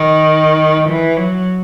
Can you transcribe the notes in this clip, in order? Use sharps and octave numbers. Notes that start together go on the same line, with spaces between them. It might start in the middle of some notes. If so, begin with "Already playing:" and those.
Already playing: D#3
E3
F#3